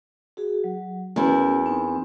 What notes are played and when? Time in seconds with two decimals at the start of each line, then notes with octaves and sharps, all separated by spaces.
0.37 F#4 G#4
0.64 F#3
1.16 E2 C#4 E4 F#4 A#4
1.66 C4 D#4